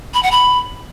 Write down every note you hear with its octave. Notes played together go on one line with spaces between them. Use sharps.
B5
F#5
B5